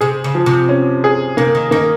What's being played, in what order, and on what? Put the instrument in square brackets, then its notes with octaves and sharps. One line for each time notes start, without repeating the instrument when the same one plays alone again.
[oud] C3 [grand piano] G#4
[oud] C#3
[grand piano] F3
[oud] C3
[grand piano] C#4
G#4
[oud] C3 [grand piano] A#3
[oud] D#3
[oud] D#3 [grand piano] A#3